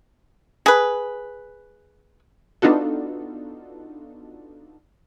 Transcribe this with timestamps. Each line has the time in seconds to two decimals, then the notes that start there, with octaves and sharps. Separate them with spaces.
0.66 G#4 B4
2.62 B3 D4 D#4 F4 F#4 A4